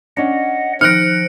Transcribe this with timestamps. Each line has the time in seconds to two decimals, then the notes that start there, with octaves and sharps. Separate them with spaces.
0.17 C#4 D4 D#5 F#5
0.81 D#3 F3 F6 F#6 A#6 C#7 D7